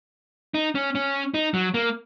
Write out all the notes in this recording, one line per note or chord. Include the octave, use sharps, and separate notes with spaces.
D#4
C#4
C#4
D#4
F#3
A#3